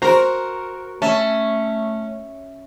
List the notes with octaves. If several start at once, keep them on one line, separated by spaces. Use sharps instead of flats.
F#4 A#4 C5 A#5
A3 C#4 E5 A5